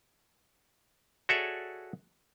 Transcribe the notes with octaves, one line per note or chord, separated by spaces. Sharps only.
F#4 G#4 A4 C#5 D5 E5